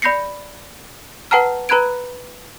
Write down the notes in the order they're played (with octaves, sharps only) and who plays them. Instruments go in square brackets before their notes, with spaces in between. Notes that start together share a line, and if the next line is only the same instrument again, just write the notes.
[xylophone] D5 B5 G6 A#6 C7 C#7
B4 F#5 G5 A5 A#5 F6
B4 A#5 B5 F#6 G#6 D7